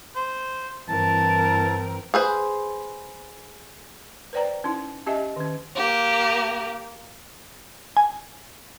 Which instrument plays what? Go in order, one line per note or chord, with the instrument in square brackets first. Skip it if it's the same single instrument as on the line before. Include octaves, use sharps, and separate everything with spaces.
[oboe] C5
[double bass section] G2 E3 [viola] C4 A#4 [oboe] A5
[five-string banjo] G#4 B4 C5
[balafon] B4 C5 D5 G5 A#5
C#4 D#4 E4
C#4 G4 D#5 E5 G#5
D#3 C#4
[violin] A#3 G4
[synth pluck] G#5